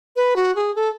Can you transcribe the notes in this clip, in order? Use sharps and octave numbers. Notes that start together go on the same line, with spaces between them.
B4
F#4
G#4
A4